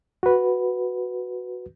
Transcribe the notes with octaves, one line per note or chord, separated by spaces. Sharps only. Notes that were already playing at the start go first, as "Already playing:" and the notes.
F#4 B4